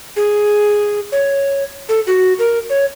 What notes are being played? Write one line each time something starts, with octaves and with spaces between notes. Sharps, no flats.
G#4
C#5
A4
F#4
A#4
C#5